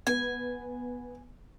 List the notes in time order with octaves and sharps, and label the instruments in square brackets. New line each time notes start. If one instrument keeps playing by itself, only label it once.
[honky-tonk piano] B3 [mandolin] G#5